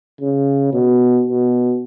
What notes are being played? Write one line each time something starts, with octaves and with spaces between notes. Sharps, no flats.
C#3
B2
B2